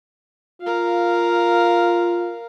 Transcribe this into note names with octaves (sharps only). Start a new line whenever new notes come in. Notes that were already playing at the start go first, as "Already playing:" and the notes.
F4 A#4 F5